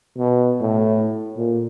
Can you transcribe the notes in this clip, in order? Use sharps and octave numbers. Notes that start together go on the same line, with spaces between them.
B2
A2
A#2